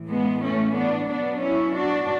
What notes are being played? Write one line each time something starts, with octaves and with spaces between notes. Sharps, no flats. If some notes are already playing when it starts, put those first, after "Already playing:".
Already playing: A2 E3
G#3 B3
A3 C#4
B3 D4
B2 F#3 B3 D4
C#4 E4
D4 F#4